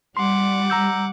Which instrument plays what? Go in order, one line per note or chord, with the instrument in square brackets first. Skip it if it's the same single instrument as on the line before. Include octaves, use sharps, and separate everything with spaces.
[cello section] G3 [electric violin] F#5 D6 [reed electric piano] C6
[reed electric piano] A#5 E6 G6